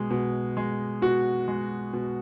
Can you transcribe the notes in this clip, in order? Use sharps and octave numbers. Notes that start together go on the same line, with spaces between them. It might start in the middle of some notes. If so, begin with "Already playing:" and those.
Already playing: B2 G#3
B2
G#3
B2 F#4
G#3
B2